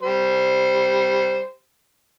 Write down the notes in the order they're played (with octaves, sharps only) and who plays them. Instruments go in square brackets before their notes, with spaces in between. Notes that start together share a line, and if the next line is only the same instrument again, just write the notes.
[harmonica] G3 C5